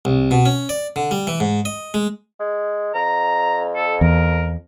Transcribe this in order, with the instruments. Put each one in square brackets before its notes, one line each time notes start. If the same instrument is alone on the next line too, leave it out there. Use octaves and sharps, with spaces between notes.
[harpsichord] C2
B2
C#4
D5
D3
G3
E3
G#2
D#5
G#3
[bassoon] G#3
[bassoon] F2 [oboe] A#5
[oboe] A4
[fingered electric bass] E2 [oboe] A#4